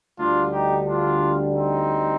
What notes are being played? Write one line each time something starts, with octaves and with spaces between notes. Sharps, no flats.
D2 D3 G3 D4 F4
D#4 G4
D4 F4
C4 D#4